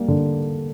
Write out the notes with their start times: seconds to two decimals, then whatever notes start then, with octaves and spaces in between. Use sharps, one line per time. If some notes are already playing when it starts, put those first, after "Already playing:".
Already playing: G3 A#3
0.08 D3